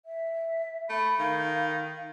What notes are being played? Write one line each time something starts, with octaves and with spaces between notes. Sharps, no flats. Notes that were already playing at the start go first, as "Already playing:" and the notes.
E5
A3 B5
D#3 F5